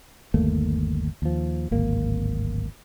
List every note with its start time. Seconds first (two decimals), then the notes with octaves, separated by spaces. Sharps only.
0.34 G1 D#2 A3 A#3
1.22 D#2 F3
1.71 D1 G#1 A#3